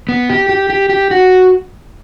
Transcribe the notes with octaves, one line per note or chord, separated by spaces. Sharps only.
B3
G4
G4
G4
G4
F#4